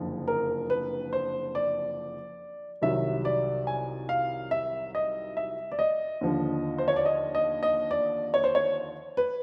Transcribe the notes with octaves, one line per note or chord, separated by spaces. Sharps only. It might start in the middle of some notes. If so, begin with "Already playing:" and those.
Already playing: F#1 F2 D3
A#4
B4
C5
D5
C2 C3 D#3 F#3 E5
D5
G#5
F5
E5
D#5
E5
D5
D#5
D#2 D3 F3
C5
C#5
D5
D#5
D#5
D#5
D5
C#5
C5
C#5
B4